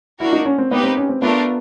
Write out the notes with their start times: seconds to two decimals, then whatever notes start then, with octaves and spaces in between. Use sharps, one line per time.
0.20 A#3 D4 E4 F#4 A#4
0.33 D#4
0.45 C#4
0.58 C4
0.71 A#3 B3 D#4 G4 B4
0.83 C4
0.97 C#4
1.09 C4
1.22 A3 B3 D4 F4 A#4